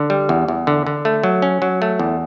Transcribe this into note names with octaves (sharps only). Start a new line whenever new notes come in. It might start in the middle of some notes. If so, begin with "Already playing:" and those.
Already playing: D3
G3
E2
E2
D3
D3
A3
F#3
C#4
F#3
A3
E2